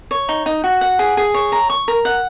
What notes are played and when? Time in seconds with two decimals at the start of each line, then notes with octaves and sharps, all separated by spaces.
0.11 C#5
0.29 D#4
0.46 D#4
0.64 F#4
0.81 F#5
0.99 G#4
1.17 G#4
1.34 C#5
1.52 A#5
1.70 C#6
1.88 A#4
2.05 F#5